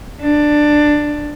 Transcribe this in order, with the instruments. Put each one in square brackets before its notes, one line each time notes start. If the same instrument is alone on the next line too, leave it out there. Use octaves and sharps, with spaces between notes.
[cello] D4